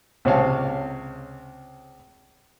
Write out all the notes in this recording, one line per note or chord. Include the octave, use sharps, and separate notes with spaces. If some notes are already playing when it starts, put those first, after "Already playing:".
C#2 C3 C4 C#5 F5 A5